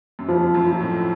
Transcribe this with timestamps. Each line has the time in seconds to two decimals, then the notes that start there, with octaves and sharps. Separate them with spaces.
0.19 F#2
0.28 F2 F3
0.54 F#2
0.67 F3
0.80 A2